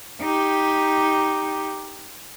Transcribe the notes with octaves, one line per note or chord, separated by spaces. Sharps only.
D#4 G4